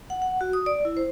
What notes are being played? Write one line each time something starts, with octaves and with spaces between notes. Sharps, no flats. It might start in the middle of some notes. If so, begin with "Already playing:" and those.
F#5
F#5
F#4
D#6
D5
E4
C5